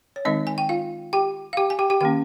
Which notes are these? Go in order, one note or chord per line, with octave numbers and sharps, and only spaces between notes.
C#5
D#3 G#3 C4 D#4 D#5
G#5
G5
F4 F5
G4 G5
F5
G4 G5
G#5
G4 G5
G4 G5
D#3 A#3 C#4 G4 G5